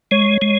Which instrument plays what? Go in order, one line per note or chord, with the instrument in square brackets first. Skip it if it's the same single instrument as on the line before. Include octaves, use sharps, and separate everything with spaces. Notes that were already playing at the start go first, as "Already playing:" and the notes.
[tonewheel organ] G#3 [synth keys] C#5
[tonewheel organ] G#3